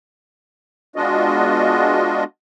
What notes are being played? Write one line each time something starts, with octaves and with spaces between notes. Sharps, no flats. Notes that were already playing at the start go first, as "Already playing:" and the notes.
G#3 B3 D4 F4 F#4 D#5